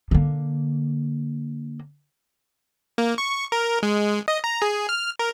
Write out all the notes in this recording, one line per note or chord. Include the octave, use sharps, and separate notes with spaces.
D3 A#3
A#3
C#6
A#4
G#3
D#5
A#5
G#4
F6
A#4